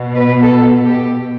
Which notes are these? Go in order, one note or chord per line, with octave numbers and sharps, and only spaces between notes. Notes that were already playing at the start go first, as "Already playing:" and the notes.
Already playing: B2
B4
A4
G4